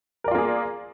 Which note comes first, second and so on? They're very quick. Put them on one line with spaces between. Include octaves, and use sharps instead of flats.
A#4 D5 F4 A#3 G#4